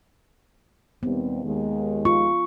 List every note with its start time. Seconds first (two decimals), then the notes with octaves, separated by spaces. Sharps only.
1.03 D#2 G3 B3 C4
1.44 D#2 D#3 G#3
2.05 F4 C#6